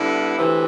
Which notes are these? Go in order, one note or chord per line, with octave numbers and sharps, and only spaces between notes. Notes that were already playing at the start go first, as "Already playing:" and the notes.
Already playing: D3 G3 B3 E4
D2 C3 E3